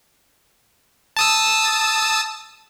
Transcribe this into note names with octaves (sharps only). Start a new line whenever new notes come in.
A5 D#6 E6